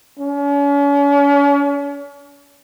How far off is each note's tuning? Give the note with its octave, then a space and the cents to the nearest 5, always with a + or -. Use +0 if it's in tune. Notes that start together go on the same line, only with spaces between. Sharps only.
C#4 +40